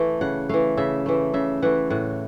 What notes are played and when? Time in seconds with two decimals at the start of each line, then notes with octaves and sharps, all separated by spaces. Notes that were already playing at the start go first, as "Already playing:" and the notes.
Already playing: E3 A3
0.21 C#3 F#5
0.49 E3 A3 F5
0.77 C#3 E5
1.06 E3 A3
1.34 C#3 E5
1.62 E3 A3 F#5
1.90 A2 F#5